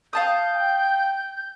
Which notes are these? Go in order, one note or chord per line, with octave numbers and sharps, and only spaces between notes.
F5 A5 D#6 G6
G5